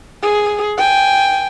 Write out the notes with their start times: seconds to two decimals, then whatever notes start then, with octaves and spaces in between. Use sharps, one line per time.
0.22 G#4
0.78 G5 G#5